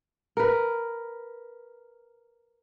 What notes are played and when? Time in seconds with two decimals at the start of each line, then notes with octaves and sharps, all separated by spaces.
0.37 A#4 B4